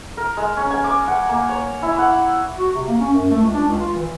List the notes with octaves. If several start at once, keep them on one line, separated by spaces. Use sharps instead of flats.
A#4
G#3
C#4
G#5
D6
F#5
A#3
C#5
E4
F#5
F#4
C3
A#3
C#4
F#2
A3
C#2
D4
C#2
F4
E3